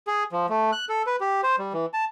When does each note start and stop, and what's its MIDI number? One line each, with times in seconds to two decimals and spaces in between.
0.07 0.24 68
0.32 0.46 53
0.49 0.71 57
0.72 0.85 90
0.89 1.02 69
1.07 1.16 71
1.21 1.41 67
1.43 1.56 72
1.59 1.73 55
1.73 1.86 52
1.94 2.05 81